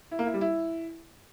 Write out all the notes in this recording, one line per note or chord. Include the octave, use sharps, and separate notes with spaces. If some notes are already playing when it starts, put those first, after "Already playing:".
E4
A#3
E4
G3
E4